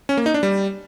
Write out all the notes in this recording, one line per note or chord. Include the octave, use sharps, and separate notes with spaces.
C#4
A#3
D#4
D4
G3